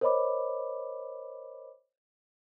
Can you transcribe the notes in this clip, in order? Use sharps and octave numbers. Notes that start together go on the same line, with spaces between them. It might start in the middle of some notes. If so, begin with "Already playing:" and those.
A#4 C5 C#5 D#5 B5 D6